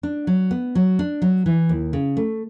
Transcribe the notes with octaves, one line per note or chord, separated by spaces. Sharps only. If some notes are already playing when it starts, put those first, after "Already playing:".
D4
F#3
B3
F#3
D4
F#3
E3
D#2
C#3
A3